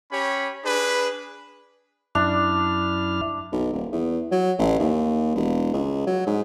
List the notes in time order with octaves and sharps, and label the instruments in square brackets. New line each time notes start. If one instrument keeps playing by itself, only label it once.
[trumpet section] C#4 G4 C#5 B5
D4 G#4 B4
[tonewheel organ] F#2 E4 F6 [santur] D4
[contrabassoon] B1
D#1
E2
F#3
A1
D#2
E1
C#2
F#3
G#2